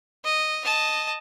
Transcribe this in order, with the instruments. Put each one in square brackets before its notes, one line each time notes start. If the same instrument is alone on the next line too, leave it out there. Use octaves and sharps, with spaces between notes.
[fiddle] D#5
D#5 A5